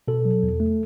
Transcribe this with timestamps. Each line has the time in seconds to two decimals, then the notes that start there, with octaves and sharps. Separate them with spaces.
0.08 B2 A4
0.25 F#3
0.43 E2
0.60 A3